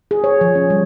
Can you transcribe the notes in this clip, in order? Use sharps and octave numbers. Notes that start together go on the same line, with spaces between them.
G#4
C#5
F3
C#4
G3